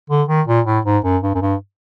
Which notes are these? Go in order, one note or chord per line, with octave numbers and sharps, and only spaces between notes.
D3
D#3
A#2
A2
G#2
F#2
G2
F#2
G2